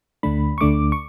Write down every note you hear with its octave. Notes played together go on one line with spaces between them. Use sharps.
D2 D3 A3 D4 B5
C#6
D2 D3 A3 D4 D6
C#6